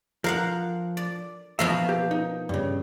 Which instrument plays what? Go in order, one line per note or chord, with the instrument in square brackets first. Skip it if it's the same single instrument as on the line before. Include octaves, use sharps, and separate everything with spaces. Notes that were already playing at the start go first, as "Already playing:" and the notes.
[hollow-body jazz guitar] F3 [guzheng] A#4 F5 F#5
[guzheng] D5
[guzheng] B2 F3 A#3 [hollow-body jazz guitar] E5 A#5
[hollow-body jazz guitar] G4
D#4
G2 C#3